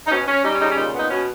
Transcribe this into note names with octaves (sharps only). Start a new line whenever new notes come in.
D#4
B2 C#4
C#4
G3 D#4
C#4
C#3 D#4
C#4
A#2 D#4
B3 D#4
B2 C#4